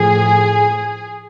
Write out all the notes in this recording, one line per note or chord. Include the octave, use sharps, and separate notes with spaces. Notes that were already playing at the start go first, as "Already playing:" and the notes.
Already playing: A2 F3 G#4